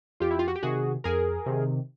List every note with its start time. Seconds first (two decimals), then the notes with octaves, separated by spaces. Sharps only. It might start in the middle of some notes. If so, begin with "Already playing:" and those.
0.20 F2 F4 G4
0.31 E4
0.39 F4
0.48 F#4
0.56 G4
0.63 C3 D#3 F#4 G#4
1.04 F2 G#4 A#4
1.46 C3 D#3